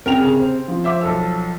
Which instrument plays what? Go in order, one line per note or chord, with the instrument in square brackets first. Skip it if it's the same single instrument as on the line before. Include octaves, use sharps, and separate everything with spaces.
[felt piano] C3 [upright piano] A#4 G5 F7
[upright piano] C#3 G#4
C4
[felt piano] F3
[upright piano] C5 E5 D6
B1 A4 E6